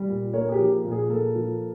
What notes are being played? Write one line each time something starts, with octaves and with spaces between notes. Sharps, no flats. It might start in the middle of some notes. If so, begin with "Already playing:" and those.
Already playing: G3
A#2
A#3 C#5
G#4
G4
F3
A#2
G#4
A#3 A4
F3